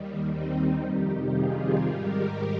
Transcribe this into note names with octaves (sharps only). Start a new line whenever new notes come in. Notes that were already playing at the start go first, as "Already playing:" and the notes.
Already playing: D#2 D#3 G3
C4 D#4
F2 C3 D#3 G3 D#4 G4
F4 G#4
G#2 D#3 G3 G4 A#4